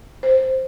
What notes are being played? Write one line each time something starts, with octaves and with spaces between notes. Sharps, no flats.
C5